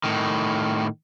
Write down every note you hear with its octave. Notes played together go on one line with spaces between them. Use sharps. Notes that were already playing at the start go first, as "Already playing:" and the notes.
A2 D#3